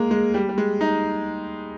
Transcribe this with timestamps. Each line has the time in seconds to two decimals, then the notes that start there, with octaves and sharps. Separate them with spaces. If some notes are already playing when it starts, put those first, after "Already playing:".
Already playing: G#3 A#3
0.11 G#3
0.34 G3
0.49 G3
0.58 G#3
0.81 D#4